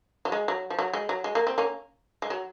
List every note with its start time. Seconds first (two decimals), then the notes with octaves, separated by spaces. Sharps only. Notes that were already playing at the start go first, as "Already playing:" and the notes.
0.25 F#3
0.32 G#3
0.48 F#3
0.70 F3
0.79 F#3
0.93 G#3
1.09 F#3
1.24 G#3
1.35 A#3
1.47 C4
1.58 A#3 C#4
2.22 G#3
2.30 F#3